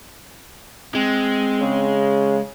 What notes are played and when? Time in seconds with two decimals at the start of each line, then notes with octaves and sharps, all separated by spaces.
0.95 G#3 C4
1.61 C#3